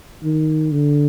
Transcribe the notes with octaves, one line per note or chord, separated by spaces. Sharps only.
D#3
D3